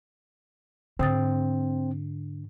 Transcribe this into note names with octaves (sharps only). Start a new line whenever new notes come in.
G#2 D3 C4 D#6 A6